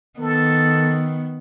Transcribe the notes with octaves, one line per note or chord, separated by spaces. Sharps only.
D#3 B3 A4